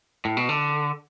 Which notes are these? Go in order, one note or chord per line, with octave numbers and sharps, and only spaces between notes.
A2
B2
D3